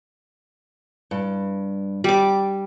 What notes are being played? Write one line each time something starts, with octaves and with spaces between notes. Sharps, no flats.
G2
G3 G5 D6